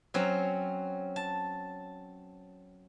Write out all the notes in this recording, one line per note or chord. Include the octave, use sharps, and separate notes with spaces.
F#3 C4 C#4
A5